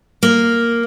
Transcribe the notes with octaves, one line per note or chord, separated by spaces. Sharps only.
A#3